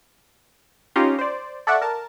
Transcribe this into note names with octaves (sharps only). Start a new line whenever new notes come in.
C#4 D#4 F4 G4 A#5 C6
C5 D5
A4 D5 E5 F#5 C#6
A#4 A5